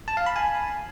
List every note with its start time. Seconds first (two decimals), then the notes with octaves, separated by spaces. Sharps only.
0.08 A5
0.17 F5
0.26 B5
0.36 G#5